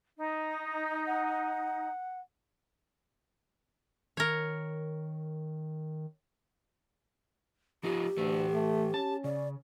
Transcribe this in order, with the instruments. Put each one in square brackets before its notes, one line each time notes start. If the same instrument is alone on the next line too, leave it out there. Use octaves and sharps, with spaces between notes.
[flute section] D#4
[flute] F#5
[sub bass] D#3 [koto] A#4 C#5
[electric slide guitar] F3 D#4 F4 [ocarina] G4
[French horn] D2 [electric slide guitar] E3 A4 B4
[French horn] A3
[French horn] C#4 [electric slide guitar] A5
[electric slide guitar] C#3 [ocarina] D5